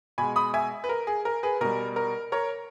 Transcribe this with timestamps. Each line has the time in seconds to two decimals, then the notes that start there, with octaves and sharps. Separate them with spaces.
0.18 B2 G#3 G#5 B5
0.36 B5 D#6
0.54 E5 G#5
0.84 B4
0.89 A#4
1.07 G#4
1.25 A#4
1.43 G#4 B4
1.61 B2 G3 A#4
1.96 A#4
2.32 A#4 C#5